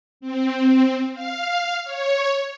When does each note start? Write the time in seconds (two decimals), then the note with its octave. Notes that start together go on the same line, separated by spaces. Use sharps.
0.21 C4
1.13 F5
1.84 C#5